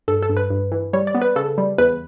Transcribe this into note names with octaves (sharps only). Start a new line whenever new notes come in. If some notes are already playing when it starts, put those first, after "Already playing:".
G2 A4
A4
G2
B4
G2
E3
G3 C#5
D5
B3
B4
C#3 A4
G3
E2 B4